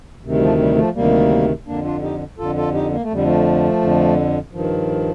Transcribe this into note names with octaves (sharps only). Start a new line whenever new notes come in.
D2 C3 D#3
G3
F3 A3
G3
F3 A3
D2 C3 D#3 G3 A#3
F2 D3 A#3 D4
D4 F4
D#4 G4
F2 D3 F4 A4
F4 A4
D#4 G4
A#3
A3
F2 D3 G3
F3 A3
F2 D3
G2 D#3 F3